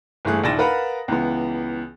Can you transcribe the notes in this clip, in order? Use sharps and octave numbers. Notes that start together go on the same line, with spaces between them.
G1 E3 A3 G#4 F#6
A#1 D#2 E4 A6 A#6 E7
A#4 B4 F5 F#5 A#5 B5
C#2 E3 B3